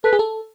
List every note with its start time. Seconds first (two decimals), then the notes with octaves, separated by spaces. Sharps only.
0.04 A4 B4
0.13 G#4
0.19 A4